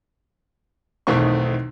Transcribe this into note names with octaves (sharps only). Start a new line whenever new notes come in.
B1 E2 D#3 A3 C4 C#6